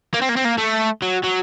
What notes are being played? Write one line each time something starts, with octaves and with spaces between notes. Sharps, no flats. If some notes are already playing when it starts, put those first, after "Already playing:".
A#3
C4
A#3
C4
A#3
A3
F#3
F#3